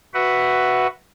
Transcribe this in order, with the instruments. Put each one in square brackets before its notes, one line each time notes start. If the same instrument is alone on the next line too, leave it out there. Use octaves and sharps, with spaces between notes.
[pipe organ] F#4 B4 E5 F#5